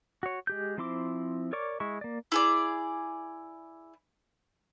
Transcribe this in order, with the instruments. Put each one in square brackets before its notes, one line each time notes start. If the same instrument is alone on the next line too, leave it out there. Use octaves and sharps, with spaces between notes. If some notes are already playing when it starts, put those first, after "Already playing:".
[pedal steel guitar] F#4 C#5
G#3 G4 G6
F3 C4 E4 C6 D6
A#4 C#5 D5 C#6 D6
G#3 E4 C#6
A#3 D5
[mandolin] E4 G#4 D5